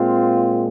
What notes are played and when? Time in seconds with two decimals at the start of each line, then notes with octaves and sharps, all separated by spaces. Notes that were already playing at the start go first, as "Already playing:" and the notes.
Already playing: A#2 G#3 C4 F4